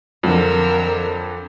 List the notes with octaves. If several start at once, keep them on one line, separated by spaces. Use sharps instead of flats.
F2 D3 F3 F#3 A#4 E6